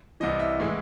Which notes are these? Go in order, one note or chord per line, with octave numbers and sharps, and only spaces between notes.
C2 C3 E3 D#5
E5
A2 E3 G#3